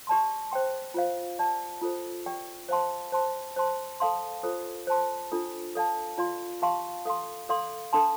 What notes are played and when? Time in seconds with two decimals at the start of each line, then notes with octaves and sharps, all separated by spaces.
0.07 G4 D5 A5 C6
0.51 C5 G5 C6
0.94 F4 C5 F5
1.38 G4 D5 A5
1.81 F4 A4 C5
2.26 G4 D5 G5
2.69 C5 F5 A5 C6
3.12 C5 A5 C6
3.56 C5 A5 C6
4.00 A4 F5 A5 C6
4.43 F4 A4 C5
4.87 C5 A5 C6
5.32 D4 F4 A4
5.75 A4 D5 F5 A5
6.18 F4 D5 F5 C6
6.62 G4 F5 A5 C6
7.05 A4 F5 C6
7.49 A4 D5 F5 C6
7.93 D4 A4 F5 A5 C6